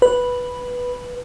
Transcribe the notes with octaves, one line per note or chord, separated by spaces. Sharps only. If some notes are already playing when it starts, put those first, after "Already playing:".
B4